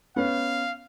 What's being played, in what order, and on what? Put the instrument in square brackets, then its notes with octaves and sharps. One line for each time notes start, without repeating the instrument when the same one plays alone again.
[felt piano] B3 C#4 [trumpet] F5